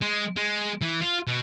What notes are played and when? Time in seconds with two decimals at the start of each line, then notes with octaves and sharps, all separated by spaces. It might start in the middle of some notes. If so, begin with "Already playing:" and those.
0.01 G#3
0.36 G#3
0.82 E3
1.01 F4
1.27 B2